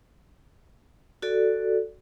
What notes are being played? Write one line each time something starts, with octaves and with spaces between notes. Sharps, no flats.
F#4 A4 D5